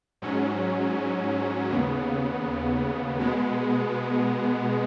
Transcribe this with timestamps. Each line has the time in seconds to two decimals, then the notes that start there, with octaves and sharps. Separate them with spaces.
0.22 G#2 F#3 C#4
1.70 D#2 C#3 B3
3.19 B2 G#3 B3